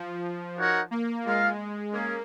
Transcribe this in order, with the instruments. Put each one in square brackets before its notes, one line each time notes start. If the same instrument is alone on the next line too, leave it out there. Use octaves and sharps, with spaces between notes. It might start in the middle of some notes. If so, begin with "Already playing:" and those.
Already playing: [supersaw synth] F3
[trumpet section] D#4 F#4 A#4 C#5 F#5
[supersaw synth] A#3
[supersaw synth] G#3 [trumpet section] F4 A#4 F5
[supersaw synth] A#3 [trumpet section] C#4 G#4